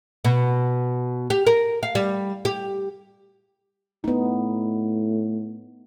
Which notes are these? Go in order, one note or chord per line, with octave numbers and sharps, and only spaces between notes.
B2
G4
A#4
F5
G3
G4
A2 B3 D#4